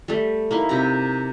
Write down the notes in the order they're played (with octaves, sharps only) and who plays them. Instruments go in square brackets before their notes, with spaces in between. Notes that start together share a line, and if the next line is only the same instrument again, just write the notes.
[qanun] G3 A3
A#3 D#4 E4
C3 G4 A#5